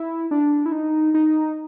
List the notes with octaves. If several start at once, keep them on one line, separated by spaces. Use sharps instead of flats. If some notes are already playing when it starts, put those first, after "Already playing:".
Already playing: E4
D4
E4
D#4
D#4